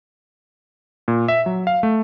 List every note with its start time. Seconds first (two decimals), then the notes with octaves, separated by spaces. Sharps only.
1.08 A#2
1.28 E5
1.46 F#3
1.67 F5
1.83 A3